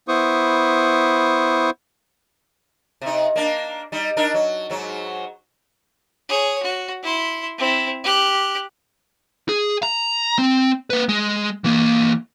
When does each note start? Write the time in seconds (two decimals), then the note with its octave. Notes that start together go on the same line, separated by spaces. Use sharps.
0.08 B3 E4 C5 C#6 D#6
3.01 C3 D#4
3.36 A#3 D4
3.92 G3 D#4
4.17 D4 D#4 A#4
4.34 F#3
4.70 G#2 F#3
6.29 G#4 C#5
6.63 F#4
7.03 E4 C6
7.58 C4 E4
8.04 G4 F#6
9.49 G#4
9.83 A#5
10.38 C4
10.90 A#3 B4
11.09 G#3
11.64 E3 A#3